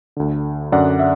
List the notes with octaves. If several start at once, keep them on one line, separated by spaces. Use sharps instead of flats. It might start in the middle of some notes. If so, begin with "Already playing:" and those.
D2 D3
F#2 D3 D5 F#5
E5